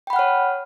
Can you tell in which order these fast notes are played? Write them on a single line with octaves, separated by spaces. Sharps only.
G5 B5 F#5 F6 C#5